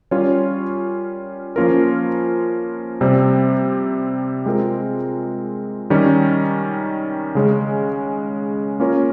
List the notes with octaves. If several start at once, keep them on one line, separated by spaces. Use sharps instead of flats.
G3 C#4 F4 A#4 C#5
F3 A#3 C#4 F4 A#4
C3 G3 C4
G#3 C4 F4 A#4
D#3 G3 C#4
C#3 G#3 C#4
A#3 C#4 F4 A#4 C#5